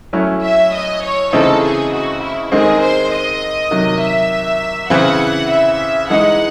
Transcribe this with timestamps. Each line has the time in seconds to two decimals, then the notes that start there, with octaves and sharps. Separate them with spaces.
0.13 F#3 A3 C#4 E4
0.44 E5
0.73 D#5
1.03 C#5
1.33 C#3 E3 A3 C4 D#4 A4
1.63 G#4
1.93 F#4
2.22 E4
2.52 D#3 G#3 C4 G#4
2.81 C5
3.12 D#5
3.71 C3 D#3 F#3
4.02 E5
4.90 C#3 E3 C4 E4 F#5
5.49 E5
6.10 E3 G#3 D#4 F#5